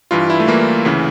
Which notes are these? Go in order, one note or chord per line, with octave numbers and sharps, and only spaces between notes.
G2 E3 F4
E4
A3
G2 E3 A#3
D2 C#3 E3